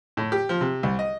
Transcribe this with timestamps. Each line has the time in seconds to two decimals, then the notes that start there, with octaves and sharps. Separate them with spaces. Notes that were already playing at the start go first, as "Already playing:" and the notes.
0.17 A2
0.32 G4
0.49 F3
0.61 C3
0.83 C2
0.99 D#5